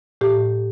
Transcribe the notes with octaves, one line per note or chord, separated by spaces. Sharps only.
A2 G4